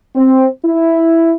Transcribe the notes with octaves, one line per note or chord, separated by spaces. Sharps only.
C4
E4